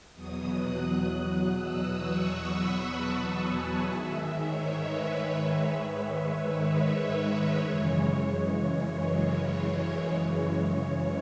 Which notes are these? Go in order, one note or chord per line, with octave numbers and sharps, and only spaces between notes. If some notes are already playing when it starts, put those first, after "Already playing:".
E2 B2 F#3 D#6
F#6
F#6
E6
C#6
B5
A5
G#5
G#2 D#3 G#3 E5
C#5
B4
C#5
F#2 C#3 E3 G#3
C#5
C#5
C#5